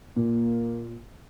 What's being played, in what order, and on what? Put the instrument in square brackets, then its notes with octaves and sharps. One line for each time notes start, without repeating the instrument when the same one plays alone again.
[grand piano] A#2 [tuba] A#3